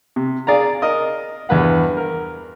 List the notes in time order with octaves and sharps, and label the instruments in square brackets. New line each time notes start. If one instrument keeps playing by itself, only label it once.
[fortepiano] C3
G#4 D5 F5 A#5
A#4 D#5 D#6
E2 G2 B4 F#5
A#4